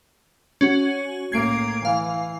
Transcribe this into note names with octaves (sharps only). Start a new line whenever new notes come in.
C#4 F#4
A2 A#3 G#6 C7 D7
E3 F5